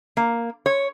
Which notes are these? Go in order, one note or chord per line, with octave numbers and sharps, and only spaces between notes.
A#3
C#5